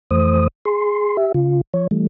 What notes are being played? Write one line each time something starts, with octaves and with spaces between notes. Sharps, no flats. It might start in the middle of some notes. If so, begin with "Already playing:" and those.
F2 E3 A3 C5 D#6
G#4 C6
G4 E5
C#3 F4
F3 C#5
E3 G3 A3